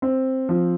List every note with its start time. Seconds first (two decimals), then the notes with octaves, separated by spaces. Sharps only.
0.02 C4
0.49 F3